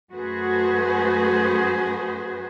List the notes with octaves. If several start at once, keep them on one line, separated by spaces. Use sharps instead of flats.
F#2 A3 F#4 G#4 B4 C5